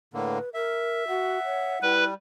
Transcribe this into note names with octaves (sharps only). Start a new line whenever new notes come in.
A2 D3 A#3 B4
A#4 E5
F#4 F#5
C#5
G3 E4 B4